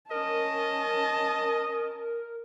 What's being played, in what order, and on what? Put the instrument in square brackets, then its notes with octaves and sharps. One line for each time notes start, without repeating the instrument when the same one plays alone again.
[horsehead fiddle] C#4 A5 [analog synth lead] A#4 [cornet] D#5